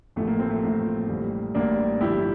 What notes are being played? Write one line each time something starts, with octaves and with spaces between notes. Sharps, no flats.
A1 A2 F3 A3
A#3
A3 C4
A3
A1 A2 F3 A#3
A1 A2 G3
A1 A2 G3 A#3 D4
G1 G2 F3 E4 G4